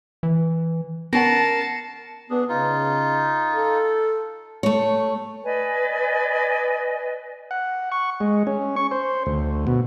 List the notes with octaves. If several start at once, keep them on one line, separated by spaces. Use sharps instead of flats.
E3
B3 C#4 A#4 F#5 A5 A#6 C7 C#7
B3 D4 G#4
C#3 D#4 F4
A4
A3 C#5
B4 D5 D#5 G#5
F#5
C#6
G#3
C#4
C#6
C5
D2
B2